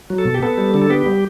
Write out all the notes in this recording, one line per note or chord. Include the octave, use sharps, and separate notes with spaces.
F#3
A4
B2
G4
B3 A4
G3
D3
A4
B3 G4
G3